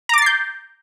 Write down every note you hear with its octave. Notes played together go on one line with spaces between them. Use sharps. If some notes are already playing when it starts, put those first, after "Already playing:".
A#5 D6 G6 A6 C7